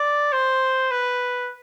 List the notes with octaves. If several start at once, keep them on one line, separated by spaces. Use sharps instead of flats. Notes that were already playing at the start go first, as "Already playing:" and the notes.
Already playing: D5
C5
B4